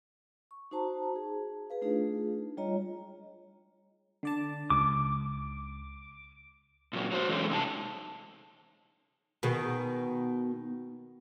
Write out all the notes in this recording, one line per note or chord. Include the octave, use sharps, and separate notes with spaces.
C#6
D#4 F#4 C5 A5 A#5
G#4
G#4 B4 F5
A3 D4 D#4 F4 G#4
G3 F4 C#5 D#5 A#5
D3 D5 A5
C#2 D6
A#2 F#3
F#3 F#4 C5
E3 F#3 G#3 C#4 A4
C3 D#4 G#5 A5
B2 D#3 G#4